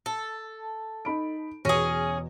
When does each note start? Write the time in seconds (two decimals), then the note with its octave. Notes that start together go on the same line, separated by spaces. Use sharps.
0.06 A4
1.05 D#4 B5 D7
1.65 E2 B2 C#4 G#4 A#6